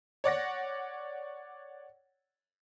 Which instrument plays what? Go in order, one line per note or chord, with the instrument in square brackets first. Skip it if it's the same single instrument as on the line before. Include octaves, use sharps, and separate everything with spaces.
[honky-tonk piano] C#5 D5 F#5 A#6